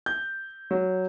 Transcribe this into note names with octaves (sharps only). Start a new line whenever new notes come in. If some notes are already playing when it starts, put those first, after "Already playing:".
G6
F#3